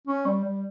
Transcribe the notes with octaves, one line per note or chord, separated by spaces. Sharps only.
C#4
G3
G3